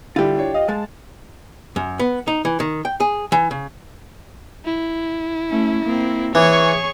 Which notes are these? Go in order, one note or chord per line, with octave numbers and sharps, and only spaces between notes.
D3 G3 E4 F4 G4
D4 C#5
D#5 F5
G#3 A5
F#2
B3
D#4
E3
D#3
G5
G#4
E3
C#3
E4
A3 C#4
A#3 C4
E3 G#4 C#5 C#6